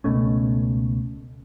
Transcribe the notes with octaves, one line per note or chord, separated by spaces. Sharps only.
C#2 B2 A3 C#4